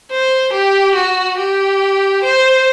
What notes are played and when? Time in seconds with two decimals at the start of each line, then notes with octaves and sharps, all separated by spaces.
0.11 C5
0.53 G4
0.95 F#4
1.37 G4
2.24 C5